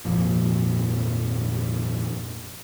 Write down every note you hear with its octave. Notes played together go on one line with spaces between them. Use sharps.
G#1 F2 A#2 F3